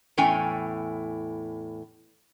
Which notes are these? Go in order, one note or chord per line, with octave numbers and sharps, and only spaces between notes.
E2 A2 C#4 G5 G#5